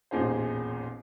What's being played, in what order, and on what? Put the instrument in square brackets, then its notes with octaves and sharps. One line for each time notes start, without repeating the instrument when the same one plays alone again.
[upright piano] E1 A1 A#2 D#4 G#4 C5